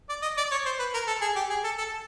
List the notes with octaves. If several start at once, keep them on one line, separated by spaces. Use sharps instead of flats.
D5
D#5
D5
C#5
C5
B4
A#4
A4
G#4
G4
G#4
A4
A4